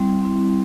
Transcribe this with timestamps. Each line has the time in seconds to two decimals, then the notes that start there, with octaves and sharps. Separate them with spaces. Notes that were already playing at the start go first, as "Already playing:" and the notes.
Already playing: G3 C4 E4
0.21 G3 C4 E4